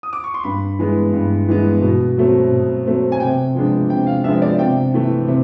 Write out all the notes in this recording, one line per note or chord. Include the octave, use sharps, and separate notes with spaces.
D#6
D6
C#6
C6
G2 B5
E3 G#3 B3
G2
E3 G#3 B3
B2
F#3 A3 C4
B2
F#3 A3 C4
G#5
C3 G5
F3 G#3 B3 D4
C3 G5
F5
F3 G#3 B3 D4 E5
D5
C3 G5
E3 A3
C3